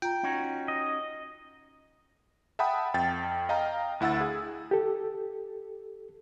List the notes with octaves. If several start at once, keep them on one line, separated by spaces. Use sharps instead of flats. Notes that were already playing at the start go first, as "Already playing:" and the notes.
F4 G5 A#5
C#4 D#4 F#4
D#5
E5 F#5 G5 A5 B5 D#6
F2 G5 A6
D#5 F5 G5 A#5
D2 E4 F#5 E6 A6
G#4
G4 A4